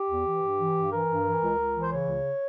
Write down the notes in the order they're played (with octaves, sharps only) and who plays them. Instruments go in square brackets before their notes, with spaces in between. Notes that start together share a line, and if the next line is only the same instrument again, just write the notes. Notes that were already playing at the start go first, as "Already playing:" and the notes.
Already playing: [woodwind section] G4
E2
E3
G2
E3
G2
E3 A#4
G2
E3
C#2
C#2
E3
C5
C#3 C#5
C#2